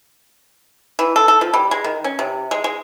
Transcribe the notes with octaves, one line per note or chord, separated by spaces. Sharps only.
E3
A4
A4
F3
G3
G#3
D#3
C#4
C3
G#3
G#3